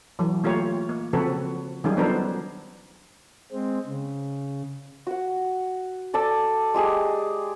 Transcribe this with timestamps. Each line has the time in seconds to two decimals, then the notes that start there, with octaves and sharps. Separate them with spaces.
0.19 E3 F#3
0.43 A3 A#3 F4 G4 C#5
0.89 A#3
1.13 C#3 F3 C4 F#4 A4 B4
1.84 D#3 F#3 G3 C#4 G#4
1.97 F3 B3 D4 A4 A#4 C5
3.52 G#3 C4
3.86 C#3
5.07 F#4 F#5
6.14 A4 D5 A5 E6
6.74 G#3 G4 G#4